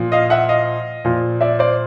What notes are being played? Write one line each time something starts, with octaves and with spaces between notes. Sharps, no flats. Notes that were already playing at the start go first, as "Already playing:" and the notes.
Already playing: A#2 F3
D#5 F5
E5 F#5
D#5 F5
A#2 F3
D5 E5
C5 D5